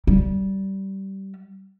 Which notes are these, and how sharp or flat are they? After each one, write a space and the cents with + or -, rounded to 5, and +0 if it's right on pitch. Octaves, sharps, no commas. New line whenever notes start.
G3 -20